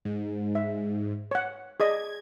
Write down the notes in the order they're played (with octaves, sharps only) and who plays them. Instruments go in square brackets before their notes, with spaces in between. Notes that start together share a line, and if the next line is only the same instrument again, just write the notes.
[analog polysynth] G#2
[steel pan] E5
C#5 F#5
[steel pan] G#4 D5 D#5 [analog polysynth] G#6